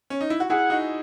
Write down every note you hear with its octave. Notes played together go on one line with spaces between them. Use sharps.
C#4
D#4
E4
F#4
E4 G#4 F#5
D#4 F#4